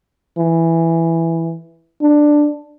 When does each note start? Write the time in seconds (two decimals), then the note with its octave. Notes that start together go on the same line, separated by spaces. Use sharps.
0.38 E3
2.02 D4